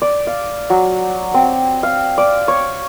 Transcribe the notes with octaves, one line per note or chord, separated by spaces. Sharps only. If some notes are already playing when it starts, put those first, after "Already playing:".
D5
F5
F#3
C4
F5
D5
C#5